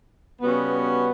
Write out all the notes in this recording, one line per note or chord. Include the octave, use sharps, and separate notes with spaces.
C#3 G3 B3 C#4 F#4